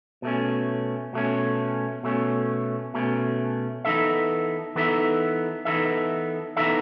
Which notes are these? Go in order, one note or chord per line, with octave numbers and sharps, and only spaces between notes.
B2 A3 C#4
B2 A3 C#4
B2 A3 C#4
B2 A3 C#4
E3 B3 D#4 A4 E5
E3 B3 D#4 A4 E5
E3 B3 D#4 A4 E5
E3 B3 D#4 A4 E5